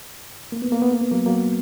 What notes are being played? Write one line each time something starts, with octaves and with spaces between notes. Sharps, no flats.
A#3
B3
A#3
B3
A#3
B3
F#3 A#3
F#3 A#3